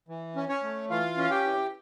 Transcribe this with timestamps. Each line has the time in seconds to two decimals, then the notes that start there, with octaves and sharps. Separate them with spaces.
0.08 E3
0.36 C#4
0.49 C#4 C#5
0.63 A3
0.90 E3 F4 F5
1.17 C#4
1.23 F5
1.31 G4 G5
1.44 E3